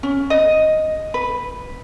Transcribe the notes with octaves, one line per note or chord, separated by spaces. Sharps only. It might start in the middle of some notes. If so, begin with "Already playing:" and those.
C#4
D#5
B4